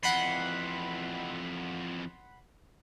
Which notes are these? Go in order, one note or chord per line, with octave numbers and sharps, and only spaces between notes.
F2 E3 F#5 B5 C6